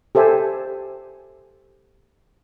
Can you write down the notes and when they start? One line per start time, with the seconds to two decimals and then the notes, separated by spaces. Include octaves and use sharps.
0.15 G4 A4 C5 E5 G#5